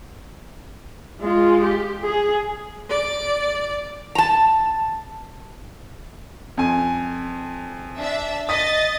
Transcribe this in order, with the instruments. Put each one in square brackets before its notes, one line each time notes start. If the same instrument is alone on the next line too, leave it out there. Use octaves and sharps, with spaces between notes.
[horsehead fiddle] G#3 F4
G4
G#4
[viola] D5
[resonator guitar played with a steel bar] A5 A#5
[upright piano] F2 G#5
[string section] D4 E5
[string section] D#5 A6 [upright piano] D#6 B6